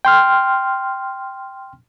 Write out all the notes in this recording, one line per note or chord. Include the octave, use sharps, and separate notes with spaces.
G5 C6 F6